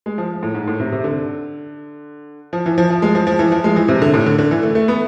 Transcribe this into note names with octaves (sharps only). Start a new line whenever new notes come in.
G#3
F3
A2
G#2
A2
C3
C3
D3
F3
E3
F3
F3
G#3
F3
F3
E3
F3
G#3
E3
C3
D3
A2
D3
D3
E3
A3
A3
B3